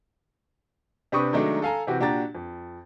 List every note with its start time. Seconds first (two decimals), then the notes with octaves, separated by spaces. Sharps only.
1.12 C3 D4 G4 B4 C#6 D#6
1.33 D#3 F#3 G#3 A3 D4 D#4
1.62 A4 F5 G#5 A#5
1.87 C3 E3 F#4 G4
2.00 A#2 D4 F#4 G4 A#5 A6
2.35 F2